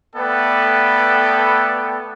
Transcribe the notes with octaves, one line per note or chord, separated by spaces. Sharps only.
A3 B3 A4 B4 D5 G5